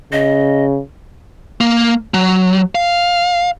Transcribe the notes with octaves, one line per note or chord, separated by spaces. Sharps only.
C#3 D#5
A#3
F#3
F5